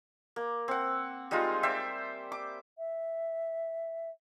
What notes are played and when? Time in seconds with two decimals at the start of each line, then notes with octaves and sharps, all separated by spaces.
0.36 A#3
0.68 C4 F#5
1.31 G3 G#3 D#4 F4
1.63 C5 D5 E5 G5
2.32 D6
2.78 E5